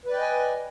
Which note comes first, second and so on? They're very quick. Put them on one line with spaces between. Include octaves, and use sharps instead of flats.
B4 D5 G5 D#5 G#5